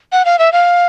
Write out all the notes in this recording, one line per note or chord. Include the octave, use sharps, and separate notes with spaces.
F#5
F5
E5
F5